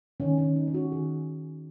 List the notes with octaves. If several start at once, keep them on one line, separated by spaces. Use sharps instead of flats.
D#3 C#4
C#4
D#3
D#4
C#4
F#4
D#3 G#4